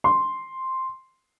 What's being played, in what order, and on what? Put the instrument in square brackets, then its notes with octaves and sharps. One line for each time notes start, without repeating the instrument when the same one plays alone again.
[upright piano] C6